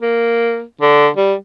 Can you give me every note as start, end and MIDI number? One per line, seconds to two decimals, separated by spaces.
0.02 0.62 58
0.81 1.08 50
1.17 1.34 55